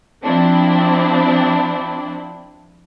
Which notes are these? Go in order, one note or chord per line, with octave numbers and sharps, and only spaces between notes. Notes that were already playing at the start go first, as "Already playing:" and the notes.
F3 C4 D4 E4